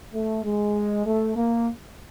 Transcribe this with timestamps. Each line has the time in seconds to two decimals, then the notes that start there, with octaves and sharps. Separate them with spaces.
0.14 A3
0.44 G#3
1.06 A3
1.36 A#3